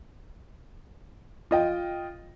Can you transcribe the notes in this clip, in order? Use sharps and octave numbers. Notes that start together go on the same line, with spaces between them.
F4 D#5 G5